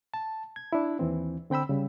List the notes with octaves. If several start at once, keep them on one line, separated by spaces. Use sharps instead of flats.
A5
G#6
D4 E4
D#2 E3 C4
D3 C4 G5 B5 E6
C#3 G3